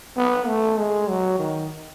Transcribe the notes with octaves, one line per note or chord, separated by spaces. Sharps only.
B3
A3
G#3
F#3
D#3